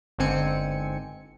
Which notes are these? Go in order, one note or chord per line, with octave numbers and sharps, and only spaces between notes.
G1 G#2 D3 C4 G#5 C#7